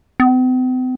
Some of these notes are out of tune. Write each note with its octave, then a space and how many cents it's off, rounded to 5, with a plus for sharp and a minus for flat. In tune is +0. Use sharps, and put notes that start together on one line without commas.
C4 -45